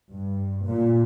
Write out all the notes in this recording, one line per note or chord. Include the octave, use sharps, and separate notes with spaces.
G2
A#2